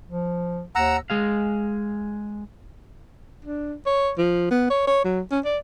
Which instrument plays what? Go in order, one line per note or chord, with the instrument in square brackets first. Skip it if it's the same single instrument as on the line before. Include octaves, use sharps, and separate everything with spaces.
[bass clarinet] F3
[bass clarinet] D#2 [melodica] F#5 A#5 E6
[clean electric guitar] G#3 G#4 F5
[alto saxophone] D4
C#5
F3
B3
C#5
C#5
F#3
C#4
D5